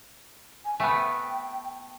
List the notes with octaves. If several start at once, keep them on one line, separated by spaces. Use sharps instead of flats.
G#5
A3 B3 G5